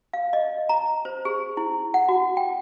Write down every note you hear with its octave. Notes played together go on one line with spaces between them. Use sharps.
F5
D#5
A#5
C5
G#4
E4
F#5
F#4
G5